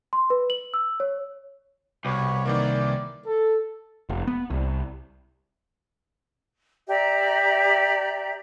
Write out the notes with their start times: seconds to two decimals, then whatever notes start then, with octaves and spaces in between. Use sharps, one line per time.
0.13 C6
0.30 B4
0.50 F#7
0.74 E6
1.00 C#5
2.05 C2 B2 G4 B4 C#5
2.45 D#3 E3 A#3 D5
3.26 A4
4.09 F1
4.27 B3
4.50 C2
6.89 G4 D5 E5 A#5